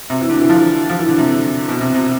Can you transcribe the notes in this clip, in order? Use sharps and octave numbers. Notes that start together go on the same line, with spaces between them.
C3
E3
D3
E3
F3
F3
E3
D3
C3
B2
C3
C3